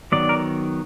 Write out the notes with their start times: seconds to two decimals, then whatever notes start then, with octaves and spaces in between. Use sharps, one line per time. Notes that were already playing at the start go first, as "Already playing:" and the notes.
0.12 D#3 F#3 B3 D5
0.29 A#4